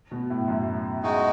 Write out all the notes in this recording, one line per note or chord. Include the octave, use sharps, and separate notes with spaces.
B2
A2
F#2
G#3 D#4 F#4